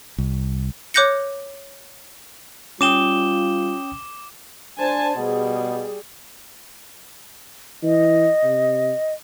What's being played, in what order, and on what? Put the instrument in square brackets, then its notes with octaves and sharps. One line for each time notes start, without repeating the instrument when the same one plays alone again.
[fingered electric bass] C2
[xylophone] C#5 D6 F#6 G6 A#6 C#7
[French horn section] G3 F4 [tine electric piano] C#4 G5 D#6 [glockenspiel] D6 E7 G7
[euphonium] D4 [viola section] C5 G#5 A5
[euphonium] B2 [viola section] G3 G#4
[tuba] E3 [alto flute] D#5
[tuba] C3